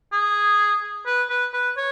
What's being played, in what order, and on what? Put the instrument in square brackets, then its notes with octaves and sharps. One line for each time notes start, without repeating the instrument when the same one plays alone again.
[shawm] G#4
B4
B4
B4
C#5